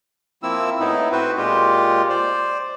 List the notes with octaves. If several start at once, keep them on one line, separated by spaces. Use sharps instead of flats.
F3 A#3 C4 E4 E6
A2 B3 D#4 E4
C4 F#4 B4 C5
A#2 G#3 F4 G4
C5 D5